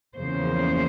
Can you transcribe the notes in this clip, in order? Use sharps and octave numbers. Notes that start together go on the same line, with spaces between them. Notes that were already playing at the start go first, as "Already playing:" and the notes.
E2 C#3 F3 A#3 C5